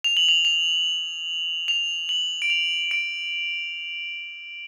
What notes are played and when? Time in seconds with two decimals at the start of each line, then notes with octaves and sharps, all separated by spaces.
0.04 F7
0.17 F#7
0.29 F7
0.45 F7
1.68 F7
2.09 F#7
2.42 D7
2.50 F7
2.91 D7